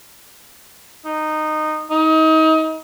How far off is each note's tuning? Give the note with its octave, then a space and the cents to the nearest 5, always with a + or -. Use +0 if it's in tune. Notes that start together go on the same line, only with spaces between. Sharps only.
D#4 -15
D#4 +30